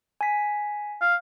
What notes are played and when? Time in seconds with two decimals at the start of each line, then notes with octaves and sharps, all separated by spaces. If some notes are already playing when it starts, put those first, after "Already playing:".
0.21 G#5 B6
1.01 F5